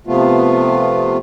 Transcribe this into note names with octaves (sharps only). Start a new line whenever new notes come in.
C3 F3 A3 B3 F4